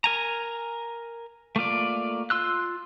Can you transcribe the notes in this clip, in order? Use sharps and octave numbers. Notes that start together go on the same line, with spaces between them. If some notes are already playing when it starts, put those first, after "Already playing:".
A#4 G#5 A#5
A3 A#3 F4 D5
F4 C6 E6 F#6